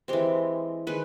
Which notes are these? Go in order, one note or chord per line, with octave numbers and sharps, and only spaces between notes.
E3 G#3 C4 G4
D#3 G#3 B4